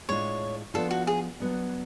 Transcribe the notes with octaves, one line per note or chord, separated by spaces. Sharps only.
A2 G#3 D4 F4 C#5
F3 B3 D4 F4 A4
F#4
G#4
F#3 B3 D4